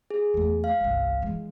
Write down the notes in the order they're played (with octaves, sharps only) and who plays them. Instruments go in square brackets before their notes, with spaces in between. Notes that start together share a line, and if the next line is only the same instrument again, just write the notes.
[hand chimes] G#4
[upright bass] E2 A3
[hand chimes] F5
[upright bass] G1 C2
E3 G#3